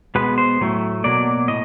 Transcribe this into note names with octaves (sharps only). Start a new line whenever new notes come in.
B2 G#3 B3 B4
C5
A2 F#3 A3
B2 F#3 A#3 D5
A2 D#5